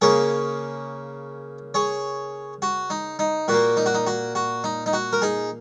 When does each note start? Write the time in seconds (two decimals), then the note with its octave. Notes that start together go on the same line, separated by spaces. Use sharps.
0.02 C#3 A#3 G#4 C#5
1.74 G#4 C#5
2.62 F#4
2.90 D#4
3.19 D#4
3.48 A#2 A#3 F#4
3.77 D#4
3.86 F#4
3.94 D#4
4.07 F#4
4.35 F#4
4.64 D#4
4.86 D#4
4.93 F#4
5.13 A#4
5.22 D#4 G#4